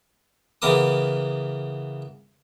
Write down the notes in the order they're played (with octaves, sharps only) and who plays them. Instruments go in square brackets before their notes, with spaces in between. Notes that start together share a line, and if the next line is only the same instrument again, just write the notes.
[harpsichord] C#3 E3 B3 A#4 D6 D#6